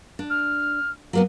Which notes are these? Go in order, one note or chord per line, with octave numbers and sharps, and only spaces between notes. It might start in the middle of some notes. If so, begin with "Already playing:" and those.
D4
F6
F#3 A#3 B3